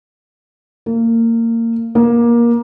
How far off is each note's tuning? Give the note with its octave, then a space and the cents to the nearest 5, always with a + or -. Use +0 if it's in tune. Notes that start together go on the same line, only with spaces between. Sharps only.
A#3 -25
A#3 +20